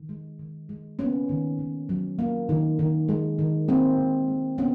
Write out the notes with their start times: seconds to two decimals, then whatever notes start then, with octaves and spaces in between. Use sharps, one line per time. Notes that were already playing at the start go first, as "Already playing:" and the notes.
Already playing: D#3
0.09 G#3
0.39 D#3
0.69 G#3
0.99 A#3 B3 C#4
1.29 D#3
1.59 D#3
1.89 F#3
2.19 A#3
2.49 D#3
2.79 D#3
3.09 G#3
3.38 D#3
3.68 G#3 A#3 C4
3.98 D#3
4.28 G#3
4.58 A#3 B3 C#4